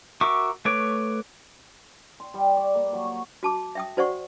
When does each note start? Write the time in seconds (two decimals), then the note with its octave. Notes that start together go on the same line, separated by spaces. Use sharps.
0.21 F#4 A#4 E5 C#6 D6
0.65 A3 B4 C#5 D6
2.20 C6
2.34 G3
2.57 D5
2.75 A#3
2.93 F#3
3.05 C#5
3.43 F#4 A5 D6
3.75 E5 G5 D#6
3.97 F#4 C5 D5 F#5 C#6